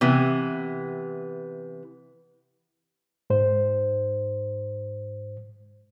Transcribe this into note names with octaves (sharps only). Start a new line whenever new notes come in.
C3 E3 B3
G#2 C5